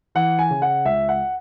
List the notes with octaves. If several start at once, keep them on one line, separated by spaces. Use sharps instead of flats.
E3 F#5
G#5
C#3
F#5
C#2 E5
F#5